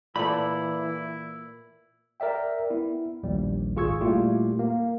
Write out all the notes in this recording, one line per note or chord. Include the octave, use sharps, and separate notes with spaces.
A#2 E3 E4 A4 D5 B5
A#4 D5 E5 G5
B3 E4
A#1 D#2 G3
G#1 F4 G#4 C#6 E6 G#6
A#2 G3 A3 E4 F4 G4
A#3